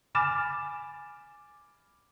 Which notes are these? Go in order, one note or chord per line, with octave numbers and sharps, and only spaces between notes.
G#5 B5 D6 F6 A6 E7